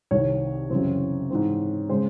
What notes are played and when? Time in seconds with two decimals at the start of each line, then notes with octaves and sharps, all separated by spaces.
0.11 C2 C3 D#3 C#5
0.70 F#2 C#3 E3 C4
1.30 G#2 E3 C4
1.89 C#3 G#3 C5